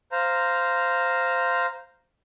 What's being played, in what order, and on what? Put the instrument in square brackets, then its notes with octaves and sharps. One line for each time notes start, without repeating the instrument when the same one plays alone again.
[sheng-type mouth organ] C5 F5 A#5